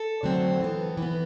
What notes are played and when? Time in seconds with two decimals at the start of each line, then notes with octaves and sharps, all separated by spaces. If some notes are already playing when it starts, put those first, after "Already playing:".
Already playing: A4
0.23 D3 F#3 A3 C4
0.60 E3 B3
0.97 E3 B3